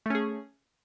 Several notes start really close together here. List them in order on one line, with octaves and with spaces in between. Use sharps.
A3 C#4 G#4